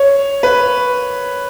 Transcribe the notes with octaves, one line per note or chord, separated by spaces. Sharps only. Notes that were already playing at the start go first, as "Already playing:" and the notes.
Already playing: C#5
B4